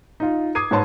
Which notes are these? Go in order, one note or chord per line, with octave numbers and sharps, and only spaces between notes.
D#4 F4
D6 D#6 G#6 C7 D#7
G#2 B4 C#5 A5 C6